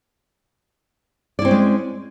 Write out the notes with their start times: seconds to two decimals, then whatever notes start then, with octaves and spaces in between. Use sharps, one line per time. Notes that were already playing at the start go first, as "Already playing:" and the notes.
1.39 D5
1.42 E4
1.45 C4
1.48 C#4
1.51 G#3